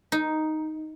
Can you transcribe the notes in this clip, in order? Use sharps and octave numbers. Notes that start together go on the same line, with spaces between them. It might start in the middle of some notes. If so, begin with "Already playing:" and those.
D#4